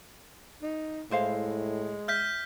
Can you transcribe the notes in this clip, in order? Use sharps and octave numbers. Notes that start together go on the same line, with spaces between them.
D#4
A2 G#3 E4 C5 F5
E5 F6 G6 B6